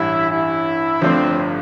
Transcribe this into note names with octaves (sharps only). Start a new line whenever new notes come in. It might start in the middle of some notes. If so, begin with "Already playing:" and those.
Already playing: A1 G2 E3 G3 E4
E4
G1 G2 F3 A3 C4 D4